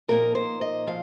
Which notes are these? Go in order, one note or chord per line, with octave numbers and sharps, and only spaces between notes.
A#2 F3 A#3 D#4 A#4
C5
D#5
A#2 F3 F5